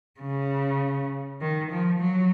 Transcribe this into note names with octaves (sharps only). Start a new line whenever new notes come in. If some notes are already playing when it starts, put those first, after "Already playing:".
C#3
D#3
F3
F#3